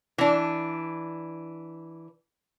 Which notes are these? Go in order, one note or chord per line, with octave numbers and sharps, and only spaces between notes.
E3 D4